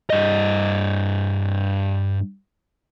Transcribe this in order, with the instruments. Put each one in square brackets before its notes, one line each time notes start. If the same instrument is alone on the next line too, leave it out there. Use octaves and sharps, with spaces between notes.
[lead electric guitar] G2 D#5